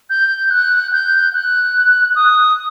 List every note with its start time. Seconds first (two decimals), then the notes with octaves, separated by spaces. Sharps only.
0.10 G6
0.50 F#6
0.93 G6
1.33 F#6
2.15 D#6